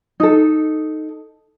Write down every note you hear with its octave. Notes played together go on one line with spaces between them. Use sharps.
D#4 A4